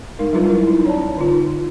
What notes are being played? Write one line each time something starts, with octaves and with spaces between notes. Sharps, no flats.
G#3 D#4 A#4
F#3 G3 D4 F4 B4
E4 A#4
D#4
C#4 C#5 D5 A5
D3 D#4 F4